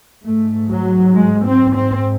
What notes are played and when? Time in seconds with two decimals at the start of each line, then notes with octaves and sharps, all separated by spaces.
0.24 G#2 A3
0.69 F#3
1.14 G#3
1.45 C4
1.75 C4